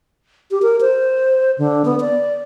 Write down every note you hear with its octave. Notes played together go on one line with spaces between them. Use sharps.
G4
A#4
C5
D3
B3
D5